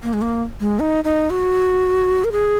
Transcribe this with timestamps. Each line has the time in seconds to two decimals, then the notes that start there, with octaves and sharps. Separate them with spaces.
0.03 A#3
0.13 G#3
0.22 A#3
0.60 G#3
0.80 D#4
1.04 D#4
1.30 F#4
2.24 A#4
2.32 G#4